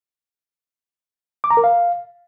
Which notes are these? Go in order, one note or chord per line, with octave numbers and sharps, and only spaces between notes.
D6
A#5
A#4
F5